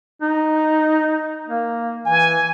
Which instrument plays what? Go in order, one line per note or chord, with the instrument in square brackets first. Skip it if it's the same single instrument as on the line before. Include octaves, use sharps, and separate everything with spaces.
[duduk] D#4
A#3
[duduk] E3 [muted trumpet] G#5